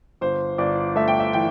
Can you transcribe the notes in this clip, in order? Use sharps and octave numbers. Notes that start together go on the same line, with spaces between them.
G1 C5
G1 D5
A3 E5
G5
E5
E3 G5